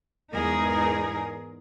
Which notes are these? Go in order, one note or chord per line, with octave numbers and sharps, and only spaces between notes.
E2 G#2 D#4 G#4 A#4